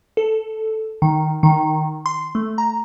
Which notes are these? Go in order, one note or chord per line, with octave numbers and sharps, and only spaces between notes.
A4
D#3
D#3
C6
A3
A#5